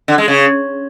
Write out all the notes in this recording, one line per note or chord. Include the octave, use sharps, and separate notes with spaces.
D3
G#3
C#3